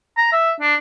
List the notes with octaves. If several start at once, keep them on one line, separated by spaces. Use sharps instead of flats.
A#5
E5
D4